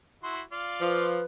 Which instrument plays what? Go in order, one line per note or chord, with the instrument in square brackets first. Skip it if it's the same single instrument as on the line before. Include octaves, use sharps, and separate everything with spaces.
[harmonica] E4 F#4 C6
F4 D5 F5
[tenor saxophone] F3 [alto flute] B4